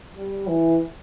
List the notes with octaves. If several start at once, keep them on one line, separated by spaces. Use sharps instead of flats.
G3
E3